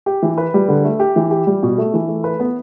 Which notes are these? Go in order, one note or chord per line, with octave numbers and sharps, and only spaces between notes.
G4
E3
B4
G3
D3
A3
G4
E3
G4
G3
B2
A3
E3
A3
B4
B3